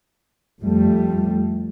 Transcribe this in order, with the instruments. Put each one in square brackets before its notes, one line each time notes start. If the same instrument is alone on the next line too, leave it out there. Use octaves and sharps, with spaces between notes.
[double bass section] F2 G3 A3